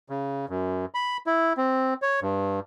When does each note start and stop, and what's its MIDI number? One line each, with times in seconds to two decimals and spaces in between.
0.09 0.46 49
0.49 0.85 42
0.94 1.17 83
1.27 1.53 64
1.57 1.94 60
2.02 2.20 73
2.22 2.60 43